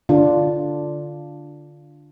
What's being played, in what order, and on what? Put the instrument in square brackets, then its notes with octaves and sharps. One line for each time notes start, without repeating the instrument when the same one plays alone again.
[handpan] D3 D4 F4